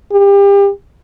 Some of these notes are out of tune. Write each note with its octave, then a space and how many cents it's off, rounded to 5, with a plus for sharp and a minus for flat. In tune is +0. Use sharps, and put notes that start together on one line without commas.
G4 +30